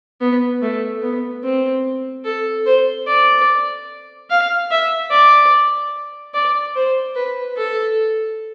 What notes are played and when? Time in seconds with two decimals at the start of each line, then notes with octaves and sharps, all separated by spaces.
0.21 B3
0.62 A3
1.02 B3
1.44 C4
2.25 A4
2.66 C5
3.07 D5
4.30 F5
4.71 E5
5.11 D5
6.34 D5
6.75 C5
7.15 B4
7.57 A4